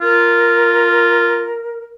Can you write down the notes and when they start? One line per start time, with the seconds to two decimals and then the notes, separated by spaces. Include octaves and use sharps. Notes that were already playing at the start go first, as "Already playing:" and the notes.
0.01 F4 A#4